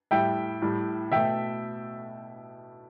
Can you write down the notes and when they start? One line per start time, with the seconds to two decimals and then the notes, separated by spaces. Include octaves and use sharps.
0.11 A2 G3 E5 G5
0.62 A2 G3
1.12 B2 A3 E5 G5